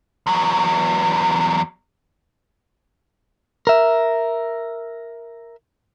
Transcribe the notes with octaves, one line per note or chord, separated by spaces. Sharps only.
E2 F#3
A#4 E5